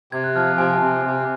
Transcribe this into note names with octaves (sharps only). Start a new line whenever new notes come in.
C3 G#6
F#6
F3 F6
C3 G#5
C3
C3